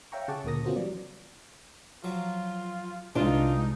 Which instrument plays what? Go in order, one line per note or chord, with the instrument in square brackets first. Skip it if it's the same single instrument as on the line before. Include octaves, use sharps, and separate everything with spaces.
[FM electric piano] C#5 E5 F5 G5 A#5 C#6
C#3 G#4 F#5 A5 C#6 D6
D2 A#2 C#3 A#4 D#6 A#6
B3 C#4 F4 F#4 A#4 C5
E3 F#3 G3 D5
[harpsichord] F3 F#3 [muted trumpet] F4
[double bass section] C2 G#3 [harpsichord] E3 [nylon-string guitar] D4 F4 [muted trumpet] D#4